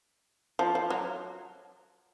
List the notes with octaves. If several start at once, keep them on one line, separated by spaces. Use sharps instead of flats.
F3
F3
F#3